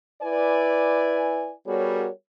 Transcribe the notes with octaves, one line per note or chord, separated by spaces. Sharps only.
E4 B4 D5 G#5
G3 B3 F#4 G#4 A#4 C#5